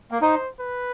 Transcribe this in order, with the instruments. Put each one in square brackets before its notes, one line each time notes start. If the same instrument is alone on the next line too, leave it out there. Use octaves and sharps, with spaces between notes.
[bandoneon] A#3
[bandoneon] D#4 [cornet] C5
[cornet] B4